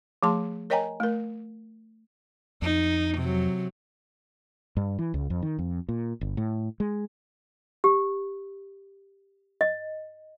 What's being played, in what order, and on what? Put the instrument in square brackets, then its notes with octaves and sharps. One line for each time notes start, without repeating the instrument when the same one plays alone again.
[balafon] F3 A3 G#4 A5 C6
A#4 C#5 D#5 G5 G#5 A#5
A3 A#4
[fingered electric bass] F2 [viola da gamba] D#4
[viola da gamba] C3 F#3
[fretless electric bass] G2
E3
C#2
F2
D#3
F2
A#2
G1
A2
G#3
[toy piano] G4
D#5